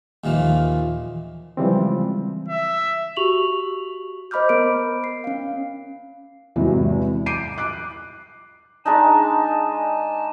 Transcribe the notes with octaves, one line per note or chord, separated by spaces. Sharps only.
D#2 A#2 E3 F3
C#3 E3 F3 G3 G#3 C4
E5
F#4 G4 C#6 F7 F#7
C5 D#5 B5 D6 F6 G6
B3 A#4 D7
C7
C#4 F5
E2 C3 E3 F#3 G#3
D6 G6 C7 D7 D#7
D6 F#6 C7
G#3 D4 D#4 G#5 A5